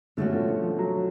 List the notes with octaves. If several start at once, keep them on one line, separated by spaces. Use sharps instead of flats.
B2 D3 A3 C#4 F#4
F3
F3
F3
F#3